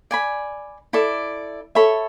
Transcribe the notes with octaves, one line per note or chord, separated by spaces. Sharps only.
D5 G#5 B5
E4 A4 D5
A4 C#5 E5 B5